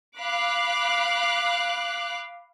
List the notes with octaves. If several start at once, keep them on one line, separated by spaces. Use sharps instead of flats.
F5 B5 D6 F#6